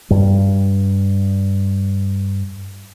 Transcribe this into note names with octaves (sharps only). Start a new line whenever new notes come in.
G2 G3